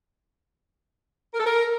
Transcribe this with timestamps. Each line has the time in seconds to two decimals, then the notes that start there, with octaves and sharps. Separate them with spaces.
1.33 A#4
1.39 A4
1.45 A#4